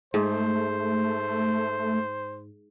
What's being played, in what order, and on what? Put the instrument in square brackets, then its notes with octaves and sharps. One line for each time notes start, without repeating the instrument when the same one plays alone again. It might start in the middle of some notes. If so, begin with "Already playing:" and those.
[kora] G#2 [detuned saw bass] A3 [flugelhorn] C5